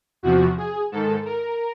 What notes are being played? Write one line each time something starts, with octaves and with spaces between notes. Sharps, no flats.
E2 C3 F3 F#4
G#4
G#2 D#3 A4
A#4